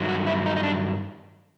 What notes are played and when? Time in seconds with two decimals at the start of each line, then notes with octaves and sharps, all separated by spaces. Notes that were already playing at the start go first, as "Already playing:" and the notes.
Already playing: G2 D#3 F#3
0.09 F#4
0.26 E4
0.46 D#4
0.56 D#4
0.63 D4